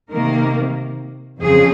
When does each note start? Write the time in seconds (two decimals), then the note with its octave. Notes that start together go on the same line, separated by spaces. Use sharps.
0.12 C3 D#3 A#3 A#4
1.41 F2 C#3 F3 C4 G#4